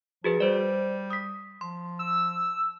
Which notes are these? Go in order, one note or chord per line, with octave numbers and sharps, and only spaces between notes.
F3 F#4 G#4 B4
G3 C5 D5
D#6 B6
F3 C6
E6